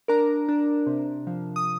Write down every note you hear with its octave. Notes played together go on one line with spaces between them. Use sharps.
D4 A#4 A#5
D4
C3
F3
D#6